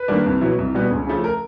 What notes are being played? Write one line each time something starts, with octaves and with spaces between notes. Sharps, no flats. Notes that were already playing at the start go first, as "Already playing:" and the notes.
Already playing: B4
D#3 G3 A#3 D4
C2
B2 F#3 B3 E4
C2
B2 G3 B3
C#2
C#3 F3 A3
A#4